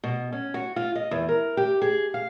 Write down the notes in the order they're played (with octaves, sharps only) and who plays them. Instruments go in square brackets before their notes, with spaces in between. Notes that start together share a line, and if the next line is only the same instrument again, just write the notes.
[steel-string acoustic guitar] B2
C#4
F#4
F4
D#5
E2
A#4
G4
G#4
F5